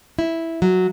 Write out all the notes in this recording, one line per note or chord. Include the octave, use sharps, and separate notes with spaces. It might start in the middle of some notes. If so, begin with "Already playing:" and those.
E4
F#3